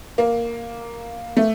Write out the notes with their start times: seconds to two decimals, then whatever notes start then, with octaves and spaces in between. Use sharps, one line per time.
0.18 A#3
1.37 A3